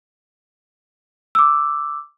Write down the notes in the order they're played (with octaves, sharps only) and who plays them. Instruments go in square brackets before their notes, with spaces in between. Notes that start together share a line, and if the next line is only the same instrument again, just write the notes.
[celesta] D6 E6